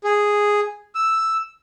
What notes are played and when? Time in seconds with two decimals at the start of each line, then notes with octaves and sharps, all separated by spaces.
0.04 G#4
0.95 E6